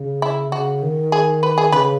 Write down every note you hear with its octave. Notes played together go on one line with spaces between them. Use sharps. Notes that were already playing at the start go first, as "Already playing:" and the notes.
Already playing: C#3
E4
C#3 F#4
D#3
G#4
B4
G#4
C#3 B4